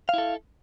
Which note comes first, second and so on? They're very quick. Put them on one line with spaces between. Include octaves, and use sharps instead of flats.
F5 E4 A4